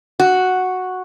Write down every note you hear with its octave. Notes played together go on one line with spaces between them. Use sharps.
F#4